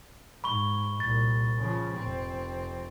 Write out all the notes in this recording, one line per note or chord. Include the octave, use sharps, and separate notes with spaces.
G#2 B5 C#6 G7
C2 A#2 A6
C#3 F3
F1 C4